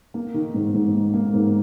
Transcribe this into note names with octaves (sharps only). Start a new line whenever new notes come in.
A#3
D#3
G#2
G#2
A#3
A#3
G#2